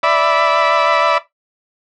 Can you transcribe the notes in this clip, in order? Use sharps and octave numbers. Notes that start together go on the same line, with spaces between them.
D5 E5 B5